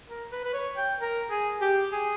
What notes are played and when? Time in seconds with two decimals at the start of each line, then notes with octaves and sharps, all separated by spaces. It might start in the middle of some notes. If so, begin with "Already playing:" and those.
0.08 A#4
0.32 B4
0.45 B4
0.53 C#5
0.77 G5
1.00 A#4
1.30 G#4
1.61 G4
1.91 G#4